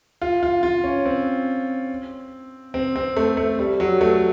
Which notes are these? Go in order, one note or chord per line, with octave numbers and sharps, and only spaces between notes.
F4
F4
F4
C#4
C4
C4
C4
A3
A3
G3
F#3
A3